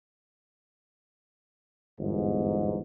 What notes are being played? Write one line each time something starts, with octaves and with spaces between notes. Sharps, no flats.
G1 E2 G#2